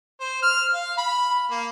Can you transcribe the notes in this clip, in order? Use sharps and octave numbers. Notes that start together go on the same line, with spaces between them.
C5
F6
F5
B5
A#3